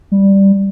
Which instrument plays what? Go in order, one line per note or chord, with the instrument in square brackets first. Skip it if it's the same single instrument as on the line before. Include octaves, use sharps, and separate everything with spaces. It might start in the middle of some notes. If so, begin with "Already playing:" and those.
[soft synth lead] G3